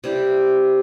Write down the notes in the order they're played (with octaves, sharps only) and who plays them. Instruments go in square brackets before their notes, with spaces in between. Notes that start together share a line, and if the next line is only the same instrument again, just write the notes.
[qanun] C3 G3 E4 G4